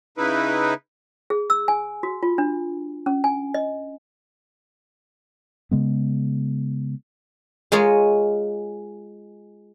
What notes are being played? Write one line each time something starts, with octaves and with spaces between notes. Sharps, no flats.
C#3 D#4 E4 B4
G#4
E6
G#5
F#4
F4
D4
C#4
G#5
D#5
C#3 G#3 B3
G#3 F4 A#4 C#5 D#5